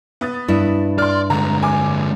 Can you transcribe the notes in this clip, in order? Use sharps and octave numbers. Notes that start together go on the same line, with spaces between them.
B3 D#6 A6
G2 E4
D5 C6 F6
D3 G#3 A#5
G#5 D6